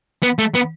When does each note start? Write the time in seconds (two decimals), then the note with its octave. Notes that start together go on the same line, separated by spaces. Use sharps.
0.23 B3
0.39 A3
0.55 B3